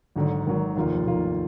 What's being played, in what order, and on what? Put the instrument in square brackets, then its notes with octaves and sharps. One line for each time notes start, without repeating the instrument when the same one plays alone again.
[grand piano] G#1 G#2 F#3 [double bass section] D3
[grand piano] G#1 G#2 F#3 [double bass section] D#3
[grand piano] F1 D#2 D#3 A#3 F4 [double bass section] F3
[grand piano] F1 D#2 D#3 A#3 F4